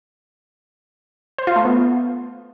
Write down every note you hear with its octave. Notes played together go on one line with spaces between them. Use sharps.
C5
F4
A3
B3